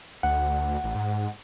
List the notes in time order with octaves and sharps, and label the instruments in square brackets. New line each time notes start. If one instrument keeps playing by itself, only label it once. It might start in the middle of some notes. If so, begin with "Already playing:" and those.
[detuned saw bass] D2 [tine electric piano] F#5
[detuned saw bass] A1
G#2